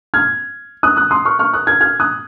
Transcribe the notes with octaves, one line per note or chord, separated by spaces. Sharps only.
F6 G#6
D#6 F#6
D#6 F#6
C6 D#6
C#6 F6
C#6 F6
D#6 F#6
F6 G#6
F6 G#6
D#6 F#6